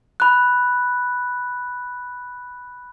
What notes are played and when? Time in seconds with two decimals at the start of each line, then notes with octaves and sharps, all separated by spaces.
0.20 B5 F#6